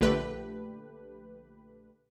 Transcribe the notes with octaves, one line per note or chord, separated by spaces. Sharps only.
A#1 D3 A3 G4 B4